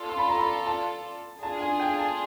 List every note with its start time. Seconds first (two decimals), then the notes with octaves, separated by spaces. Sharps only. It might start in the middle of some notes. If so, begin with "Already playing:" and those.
Already playing: F4 A4 D5
0.10 C6
0.18 B5
0.28 A#5
0.38 B5
0.67 A5
1.42 D4 F4 G#4 A5
1.61 G#5
1.80 G5
1.99 A5